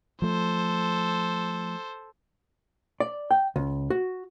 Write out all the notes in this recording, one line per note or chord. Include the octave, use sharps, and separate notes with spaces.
F3 A3 A4 C5
D5
G5
C#2
F#4